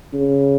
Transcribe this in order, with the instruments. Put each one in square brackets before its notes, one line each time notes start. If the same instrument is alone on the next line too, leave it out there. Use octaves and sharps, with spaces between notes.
[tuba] C#3